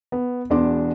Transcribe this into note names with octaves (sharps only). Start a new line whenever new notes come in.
B3
E1 E2 B3 D4 C6 D6